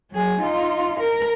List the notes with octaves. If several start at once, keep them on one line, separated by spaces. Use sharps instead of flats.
F#3 G#4
D#4 F4
A#4